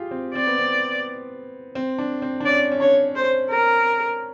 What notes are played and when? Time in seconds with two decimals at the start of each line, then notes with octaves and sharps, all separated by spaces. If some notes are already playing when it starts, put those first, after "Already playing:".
Already playing: F4 G4 G#4
0.11 C4
0.35 C4 D5
0.47 B3
0.59 C4
1.75 C4
1.98 D4
2.22 C4
2.40 D4
2.46 C#4 D5
2.72 C#4
2.80 D4 C#5
3.16 C5
3.50 A#4